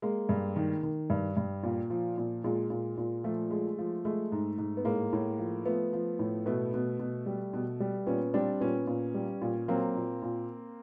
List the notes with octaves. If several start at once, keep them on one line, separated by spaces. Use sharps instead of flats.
G#3 A#3
G2
D#3
D#3
G2
G2
A#2
F3
A#2
A#2 G#3
A#2
A#2
F3 A3
G#3
F3
G#3 A3
G#2
G#2
B3
A2 G#3 A#3
A2
F3
F3 A3 B3
F3
A2
B2 A3 B3
B2
B2
G3
B2
G3
A#2 B3 C#4
G3 C4 D4
A#2 B3 C#4
A#2
G3
A#2
F#3 A#3 C4
A#2
A#2